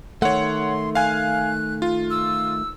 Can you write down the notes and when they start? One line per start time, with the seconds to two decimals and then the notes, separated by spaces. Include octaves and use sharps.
0.22 D#3 A3 C#5 F#5 C6
0.95 F5 G#5 F#6
1.82 F4
2.10 E6